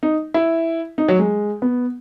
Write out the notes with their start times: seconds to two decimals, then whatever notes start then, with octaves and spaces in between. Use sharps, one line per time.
0.03 D#4
0.34 E4
0.98 D#4
1.08 F#3
1.19 G#3
1.62 B3